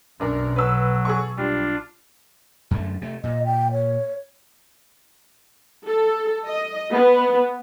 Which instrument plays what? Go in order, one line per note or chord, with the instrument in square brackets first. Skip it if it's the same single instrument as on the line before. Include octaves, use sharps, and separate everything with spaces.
[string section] B1 [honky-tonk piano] F#2 D4 A#4
[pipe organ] F#3 [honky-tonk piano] B4 E6
[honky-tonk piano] G#4 A4 C#6
[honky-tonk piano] G3 [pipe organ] D4 F4
[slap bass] F#2 D3 A3
C3 A3
[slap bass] A#2 [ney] D#5
[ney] G5
C#5
[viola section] A4
D#5
B3